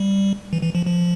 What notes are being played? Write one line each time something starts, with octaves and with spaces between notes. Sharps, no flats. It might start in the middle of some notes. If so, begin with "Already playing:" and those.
Already playing: G3
E3
E3
F3
F3